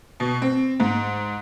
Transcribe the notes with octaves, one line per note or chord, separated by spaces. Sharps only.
B2
C4
G#2